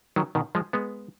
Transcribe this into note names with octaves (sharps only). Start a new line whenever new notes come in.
D#3 F#3
B2 D#3
F3 G#3
G#3 B3